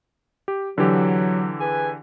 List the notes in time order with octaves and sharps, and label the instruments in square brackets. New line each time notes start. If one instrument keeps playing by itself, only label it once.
[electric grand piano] G4
[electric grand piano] D3 E3 G4 [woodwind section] F#3
[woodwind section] G#4 B4 G#5